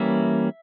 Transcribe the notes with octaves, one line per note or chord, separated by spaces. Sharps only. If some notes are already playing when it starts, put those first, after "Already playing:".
Already playing: E3 G3 A#3 C#4 E5